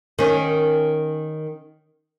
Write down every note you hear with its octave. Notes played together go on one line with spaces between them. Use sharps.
D#3 C#4